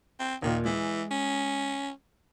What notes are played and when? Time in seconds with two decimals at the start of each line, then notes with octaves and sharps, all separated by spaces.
0.19 C4
0.42 D#2 A#2 D#3
0.65 E3 G#3
1.11 C#4